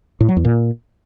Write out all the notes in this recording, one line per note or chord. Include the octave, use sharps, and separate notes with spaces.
A2
F#3
E2
A#2